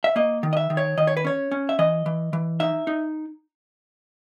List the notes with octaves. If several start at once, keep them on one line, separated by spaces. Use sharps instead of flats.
E5
A#3 D#5
D#3
D#5
E5
D#3
C#5
D#3 D#5
C#5
B4
C#4 C#5
C#4
E5
E3 D#5
E3
E3
D#4 E5
D#4